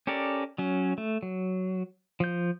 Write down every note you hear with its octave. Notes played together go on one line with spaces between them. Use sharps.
C#4 G4 A4 A#4 D5
F#3 C#4
A3
F#3
F3 G6